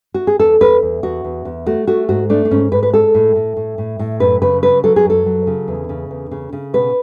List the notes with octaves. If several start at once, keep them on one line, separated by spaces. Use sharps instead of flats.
F#4
G#4
E2 A4
E2 B4
E2
E2 F#4
E2
E2
A3 F#4
A3 F#4
G#2 F#4
A3 D4
D4
G#2 C#4
G#2 B4
B4
G#3 A4
A2
A2
A2
A2
A2
F#2 B4
C#3 B4
F#3 B4
F#3 A4
G#4
F#2
A4
F#3
C#3
E2
C#3
E2
C#3
C#3
B2 B4